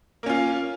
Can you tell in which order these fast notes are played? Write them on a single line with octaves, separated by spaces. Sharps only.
A#3 C#4 F4